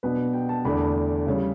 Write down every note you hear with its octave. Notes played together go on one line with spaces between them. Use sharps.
B2 F#3 B3 D4 B4
G5
A5
E2 D3 A3 D4 B5
C#3 G3 C#4